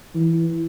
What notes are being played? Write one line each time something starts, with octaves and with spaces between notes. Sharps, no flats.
E3